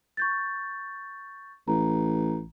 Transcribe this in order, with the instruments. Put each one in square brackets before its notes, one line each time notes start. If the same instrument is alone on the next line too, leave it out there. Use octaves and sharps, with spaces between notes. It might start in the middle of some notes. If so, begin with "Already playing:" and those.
[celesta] C#6 G6 A6
[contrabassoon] A1 [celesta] A#5